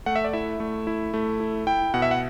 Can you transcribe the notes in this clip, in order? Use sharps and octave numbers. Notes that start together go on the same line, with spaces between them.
A3 F#5
E5
D5
E4 E5
A3
E4
A3
E4
E4 G5
B2 F#5
E5
F#5